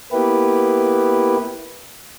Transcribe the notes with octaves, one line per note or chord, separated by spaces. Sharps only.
A#3 B3 E4 G4 B4